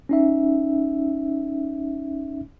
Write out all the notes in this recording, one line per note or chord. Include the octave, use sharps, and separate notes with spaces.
C#4 D#4 E5